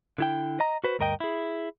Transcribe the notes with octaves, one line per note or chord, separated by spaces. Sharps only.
D3 E4 G5
D#5 A#5
F#4 B4 C5
D2 G2 A#4 D#5 G5
E4 G#4